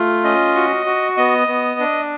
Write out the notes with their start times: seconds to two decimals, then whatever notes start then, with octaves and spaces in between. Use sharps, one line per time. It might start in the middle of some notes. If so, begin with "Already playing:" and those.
Already playing: A3 F4
0.24 C#4 D#5
0.55 F#4
0.86 F#4
1.17 B3 D#5
1.48 B3
1.80 D4